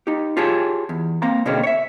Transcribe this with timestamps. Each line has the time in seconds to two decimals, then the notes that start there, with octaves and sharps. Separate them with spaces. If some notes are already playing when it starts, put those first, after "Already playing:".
0.07 D#4 G4
0.37 F4 G4 G#4 C#5 A5
0.89 E2
1.22 A#3 C4 F5 A#5
1.46 B2 D3 A#3 C4 C#4 G#4
1.63 C#5 E5